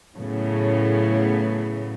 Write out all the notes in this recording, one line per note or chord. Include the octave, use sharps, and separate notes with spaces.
A2 C#3 F#3 B3